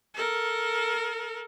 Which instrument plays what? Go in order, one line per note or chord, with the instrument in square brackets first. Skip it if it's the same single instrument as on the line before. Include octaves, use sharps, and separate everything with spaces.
[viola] A4 A#4